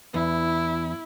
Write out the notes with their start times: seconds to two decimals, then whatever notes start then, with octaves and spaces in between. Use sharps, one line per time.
0.14 E2 E4